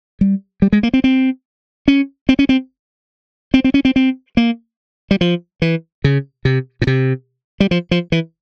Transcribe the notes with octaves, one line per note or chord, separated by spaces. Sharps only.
G3
G3
G#3
A#3
C4
C4
C#4
C4
C#4
C4
C4
C4
C#4
C4
C4
A#3
G3
F3
E3
C#3
C3
A#2
C3
G3
F3
F3
E3